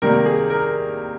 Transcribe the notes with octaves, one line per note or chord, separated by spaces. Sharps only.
C3 D#3 G3 A#3 A#4
G#4
A#4